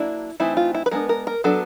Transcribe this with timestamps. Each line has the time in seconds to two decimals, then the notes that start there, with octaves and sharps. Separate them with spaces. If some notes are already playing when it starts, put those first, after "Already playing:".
Already playing: F#3 A#3 D4 E4
0.40 E3 A3 C4 D#4 E4
0.57 F4
0.75 E4
0.86 B4
0.91 G#3 B3 D4 A#4
1.09 A#4
1.27 A#4
1.44 F#3 B3 D4 A4